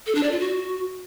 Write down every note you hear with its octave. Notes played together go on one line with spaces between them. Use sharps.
A4
D4
D5
F4
F#4